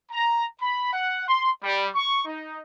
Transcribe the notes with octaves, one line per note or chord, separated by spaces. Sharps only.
A#5
B5
F#5
C6
G3
C#6
D#4